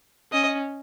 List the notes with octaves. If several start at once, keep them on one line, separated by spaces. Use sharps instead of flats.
C#4 D#5